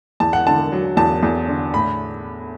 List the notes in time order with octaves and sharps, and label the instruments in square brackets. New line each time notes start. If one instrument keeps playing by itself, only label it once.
[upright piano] E2 A5
F#5
D3 A5
F#3
E2 A5
E2
D3
A2 B5